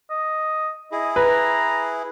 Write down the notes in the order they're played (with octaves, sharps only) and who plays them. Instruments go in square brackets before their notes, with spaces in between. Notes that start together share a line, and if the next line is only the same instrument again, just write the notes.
[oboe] D#5
[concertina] E4 G#4 [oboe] D#5
[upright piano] B4 [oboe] A#5